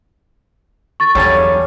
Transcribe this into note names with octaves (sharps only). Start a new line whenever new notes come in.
C#6 A6
E2 F#3 G3 D4 A4 F5 G#5